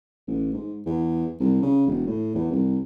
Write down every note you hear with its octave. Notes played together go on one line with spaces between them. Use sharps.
A1
G#2
E2
C2
C#3
E1
A2
E2
C2